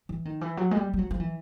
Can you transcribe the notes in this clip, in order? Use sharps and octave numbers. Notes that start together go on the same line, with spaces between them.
E3
D#3
E3
F#3
G#3
G3
G3
F#3
F3
E3